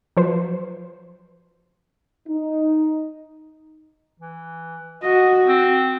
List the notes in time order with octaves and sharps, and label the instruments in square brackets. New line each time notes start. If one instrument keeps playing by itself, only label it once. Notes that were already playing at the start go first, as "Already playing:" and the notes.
[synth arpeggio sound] F3 F#3 B4 C5
[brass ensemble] D#4
[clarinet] E3
[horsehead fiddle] F#4 [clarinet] D#5
[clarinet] C4